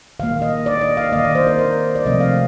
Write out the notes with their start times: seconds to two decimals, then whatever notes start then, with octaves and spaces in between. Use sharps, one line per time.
0.20 D#3 A#3 F5
0.42 D#5
0.66 D5
0.81 D#5
0.97 F5
1.12 D#3 A#3 D#5
1.24 D5
1.35 C5
1.47 A#4
1.59 C5
1.95 D5
2.05 C3 F3 A3 C4 D#5
2.21 F5